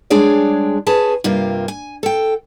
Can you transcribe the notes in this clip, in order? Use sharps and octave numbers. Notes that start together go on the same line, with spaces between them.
G3 G#3 D4 G#4 C#5 D5
C#4 G#4 B4 A5
G2 C3 A#3 F4
G#5
A4 G5